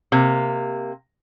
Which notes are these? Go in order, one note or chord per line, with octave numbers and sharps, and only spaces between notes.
C3 A#3